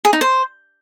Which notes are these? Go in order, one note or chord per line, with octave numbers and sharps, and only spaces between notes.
G#4
D#4
C5